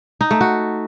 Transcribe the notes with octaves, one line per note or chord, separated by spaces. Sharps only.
D#4
A3
F#4